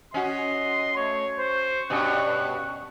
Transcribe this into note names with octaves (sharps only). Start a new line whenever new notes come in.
C#4 F#4 D#5 C6
A3 C#5
C5 C#6
G2 B2 C#4 F#6